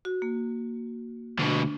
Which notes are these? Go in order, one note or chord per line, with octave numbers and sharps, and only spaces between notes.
F#4
A#3
D2 B2 D4